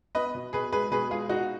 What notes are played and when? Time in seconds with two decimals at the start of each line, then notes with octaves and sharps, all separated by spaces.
0.15 B3 B4 D#5
0.35 B2
0.53 B2 G#4 B4
0.73 G#3 G#4 B4
0.91 B2 G#4 B4
1.10 G#3 F4 G#4
1.29 B2 D#4 F#4